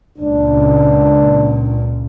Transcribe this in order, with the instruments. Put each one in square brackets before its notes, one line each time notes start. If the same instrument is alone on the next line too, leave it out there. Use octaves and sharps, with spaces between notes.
[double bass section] C#2 A#2 [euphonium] D4